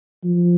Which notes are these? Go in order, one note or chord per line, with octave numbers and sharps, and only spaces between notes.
F3